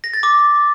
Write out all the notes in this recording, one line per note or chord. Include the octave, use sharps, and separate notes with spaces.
A#6
A6
D6